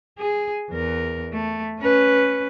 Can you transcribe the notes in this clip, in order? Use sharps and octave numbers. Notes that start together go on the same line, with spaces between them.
G#4
E2 A#4
A3
C#4 B4